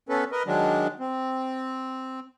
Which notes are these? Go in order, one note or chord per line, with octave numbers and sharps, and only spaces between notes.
B3 C#4 A4 B4
A#4 B4 D#5
D#3 F#3 G#3 D4
C4